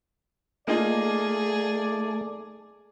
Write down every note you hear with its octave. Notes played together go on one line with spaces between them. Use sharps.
A3 A#3 D#4 F4 G#4 D5